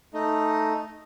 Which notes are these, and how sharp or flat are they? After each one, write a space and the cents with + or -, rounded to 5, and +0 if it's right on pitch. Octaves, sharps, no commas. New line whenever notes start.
A3 +0 D#4 +0